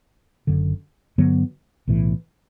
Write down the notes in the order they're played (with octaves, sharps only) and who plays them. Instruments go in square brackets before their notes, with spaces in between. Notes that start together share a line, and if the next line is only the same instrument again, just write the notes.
[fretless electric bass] F#1 F#2 D3
G2 D3 F#3 B3
B1 A2 E3